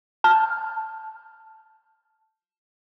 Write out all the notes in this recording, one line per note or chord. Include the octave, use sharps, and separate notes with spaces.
A5 F6 G6